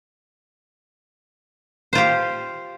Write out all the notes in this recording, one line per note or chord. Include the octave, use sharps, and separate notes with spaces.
F4 G4 C5